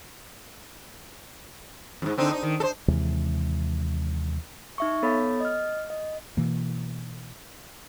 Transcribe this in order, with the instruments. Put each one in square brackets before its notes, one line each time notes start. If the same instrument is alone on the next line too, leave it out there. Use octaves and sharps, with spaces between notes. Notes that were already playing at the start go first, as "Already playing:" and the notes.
[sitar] F2 G#2
D3 C4 D#4
D#4
D#3
A4 C5
[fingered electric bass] D#2 C3 E3 G#3
[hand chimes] D#4 E5 C#6
B3 A4 C#5 B5 A6
D#5 F6
D#5
[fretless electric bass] B2 E3 A#3